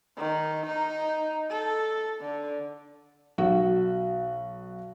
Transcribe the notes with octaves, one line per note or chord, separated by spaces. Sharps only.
D#3
D#4
A4
D3
B1 F#4